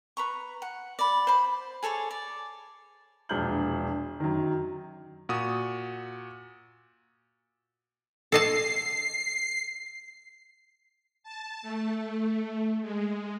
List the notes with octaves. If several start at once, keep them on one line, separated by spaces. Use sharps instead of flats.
B4 A#5 C#6
F#5
D5 B5
C5 B5
G#4 A4 C#5 D5
D5
E1 A#1 D4 F6 G6 F#7
F#2 D#3
A#2 F#4 D#6
A4 D#5 A5 C7
A5
A3
G#3